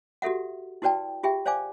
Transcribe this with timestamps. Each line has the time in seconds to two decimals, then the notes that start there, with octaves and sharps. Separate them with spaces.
0.22 F#4 G4 A4 E5 F#5
0.82 E4 F#4 B4 D5 G5 A5
1.23 F4 G4 G#4 E5 G5
1.46 C5 D5 F5 G#5 D6